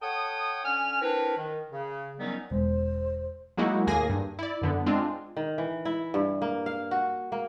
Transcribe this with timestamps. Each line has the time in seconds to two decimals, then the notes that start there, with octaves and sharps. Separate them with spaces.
0.02 A4 C#5 F#5 G5 D#6
0.64 D3 C#4 G#5 F6
1.02 C4 D4 E4 A#4 B4
1.37 D#3
1.72 C#3
2.19 D#3 F#3 G3 B3 C#4 D#4
2.51 E1 G#3 C5
3.57 F#3 G#3 A#3 D#4 E4 F#4
3.87 D#2 A2 A#3 G#4 G#5 A#6
4.10 G2
4.39 E4 D5
4.62 F#2 D3 B3
4.86 G#3 C4 D4 F4
5.37 D#3
5.58 E3
5.85 E4
6.14 G2
6.42 A#3
6.66 F5
6.91 F#4
7.32 A#3